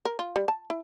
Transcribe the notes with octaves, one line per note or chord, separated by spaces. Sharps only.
A#4
F4
G3
A5
E4